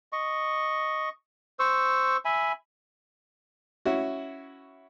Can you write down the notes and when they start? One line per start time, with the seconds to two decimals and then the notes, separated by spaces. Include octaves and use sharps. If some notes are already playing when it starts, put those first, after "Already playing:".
0.13 D#5 C#6
1.59 C5 C#6 E6
2.25 E5 G#5 B5
3.85 C#4 E4 F#4